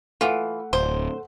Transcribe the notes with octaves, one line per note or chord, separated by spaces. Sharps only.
E3 A3 F4 F#5
D1 C5